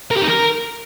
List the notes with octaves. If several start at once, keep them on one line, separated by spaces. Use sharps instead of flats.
A#4
G4
D#4
A#4